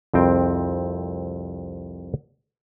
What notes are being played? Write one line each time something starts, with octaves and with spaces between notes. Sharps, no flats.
C2 F2 C4 G5